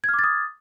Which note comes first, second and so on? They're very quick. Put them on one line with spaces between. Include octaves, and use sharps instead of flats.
G#6 F6 D6 A6 D#6